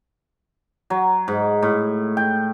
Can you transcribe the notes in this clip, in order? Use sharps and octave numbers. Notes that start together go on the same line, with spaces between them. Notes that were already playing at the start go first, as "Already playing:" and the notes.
F#3
G#2
A2
G5